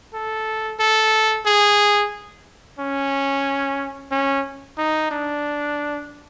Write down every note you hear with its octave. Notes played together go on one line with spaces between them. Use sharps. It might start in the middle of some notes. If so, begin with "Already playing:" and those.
A4
A4
G#4
C#4
C#4
D#4
D4